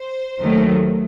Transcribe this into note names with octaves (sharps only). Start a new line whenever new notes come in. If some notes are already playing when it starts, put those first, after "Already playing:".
Already playing: C5
D#2 D#3 F#3 A3